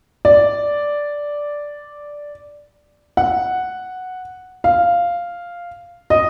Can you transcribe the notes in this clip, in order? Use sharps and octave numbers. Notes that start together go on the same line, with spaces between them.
D5
F#5
F5
D#5